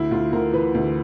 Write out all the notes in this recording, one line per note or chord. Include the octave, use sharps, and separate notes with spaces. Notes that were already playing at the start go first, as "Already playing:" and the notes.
Already playing: D2 E4
D2 F4
D2 A#4
E3 B4
D2